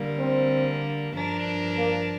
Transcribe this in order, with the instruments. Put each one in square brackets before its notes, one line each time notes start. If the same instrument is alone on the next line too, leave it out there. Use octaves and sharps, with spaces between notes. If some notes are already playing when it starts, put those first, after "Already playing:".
Already playing: [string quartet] D3 G3 A#3
[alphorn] C4
[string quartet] G2 F3 D4 A#4
[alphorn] A#3